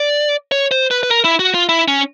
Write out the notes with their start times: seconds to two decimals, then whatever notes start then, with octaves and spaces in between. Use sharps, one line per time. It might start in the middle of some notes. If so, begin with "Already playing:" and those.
Already playing: D5
0.52 C#5
0.71 C5
0.91 B4
1.03 B4
1.10 A#4
1.25 E4
1.39 F#4
1.54 F4
1.69 E4
1.88 C#4